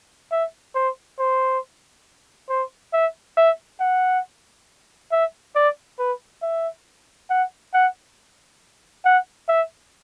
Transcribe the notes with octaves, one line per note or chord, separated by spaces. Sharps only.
E5
C5
C5
C5
E5
E5
F#5
E5
D5
B4
E5
F#5
F#5
F#5
E5